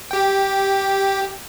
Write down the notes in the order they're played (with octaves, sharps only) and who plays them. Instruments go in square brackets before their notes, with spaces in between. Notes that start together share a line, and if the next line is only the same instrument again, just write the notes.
[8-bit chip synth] G4 G5